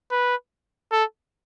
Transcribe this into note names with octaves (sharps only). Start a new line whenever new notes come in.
B4
A4